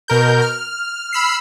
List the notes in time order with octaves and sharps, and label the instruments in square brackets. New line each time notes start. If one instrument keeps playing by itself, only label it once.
[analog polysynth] B2 A#4 G6
F6
B5 E6 F6 C7